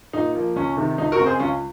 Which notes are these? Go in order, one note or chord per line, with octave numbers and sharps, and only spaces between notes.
A#2 D#4
F3 A#3
C#2 C#4
C3 D#3
C#2 D#4
F#4 A#4
C#3 G#3 C4
G#4 C5
C#2 C#4 F4